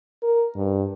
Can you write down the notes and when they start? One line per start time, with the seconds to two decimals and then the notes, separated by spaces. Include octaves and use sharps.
0.23 A#4
0.56 G2